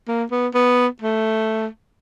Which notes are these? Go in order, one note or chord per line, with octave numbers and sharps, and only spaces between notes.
A#3
B3
B3
A3